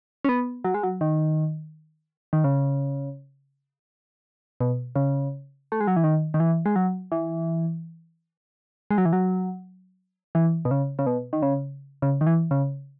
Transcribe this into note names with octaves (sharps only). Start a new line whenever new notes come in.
C#4
B3
F#3
G#3
F#3
D#3
D#3
C#3
B2
C#3
A3
G#3
F#3
E3
D#3
D#3
E3
G#3
F#3
E3
G#3
F#3
E3
F#3
E3
B2
C#3
C#3
B2
D#3
C#3
C#3
D#3
E3
C#3